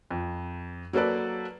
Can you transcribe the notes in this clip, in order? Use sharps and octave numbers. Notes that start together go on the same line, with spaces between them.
F2
F#3 A#3 A4 B4 D5